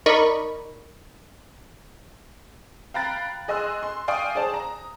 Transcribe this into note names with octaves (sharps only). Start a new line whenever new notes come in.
D#4 A#4 D5 D#5 B5 C#6
F5 G5 A#5 B5 F#6 A6
G#4 D#5 G#5 C6 E6 F#6
C6
D5 F5 G5 G#5 C#6 D#6
G#4 C5 D5 A5
A#5